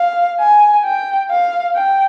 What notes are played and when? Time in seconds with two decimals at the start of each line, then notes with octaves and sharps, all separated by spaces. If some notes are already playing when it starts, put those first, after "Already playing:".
Already playing: F5
0.39 G#5
0.84 G5
1.30 F5
1.75 G5